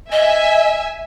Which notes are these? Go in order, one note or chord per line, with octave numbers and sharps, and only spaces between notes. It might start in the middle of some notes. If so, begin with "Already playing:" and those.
D#5 E5 G#5